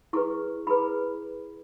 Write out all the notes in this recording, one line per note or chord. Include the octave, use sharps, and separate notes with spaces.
E4 G#4 B4 C#6
E4 G#4 B4 B5